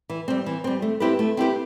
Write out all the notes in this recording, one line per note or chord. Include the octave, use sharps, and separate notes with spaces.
E3
G3 C4
E3
G3 C4
A3
C4 E4 G4 B4
A3
C4 E4 G4 B4